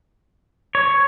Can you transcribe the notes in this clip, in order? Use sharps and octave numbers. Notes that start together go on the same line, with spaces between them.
C#5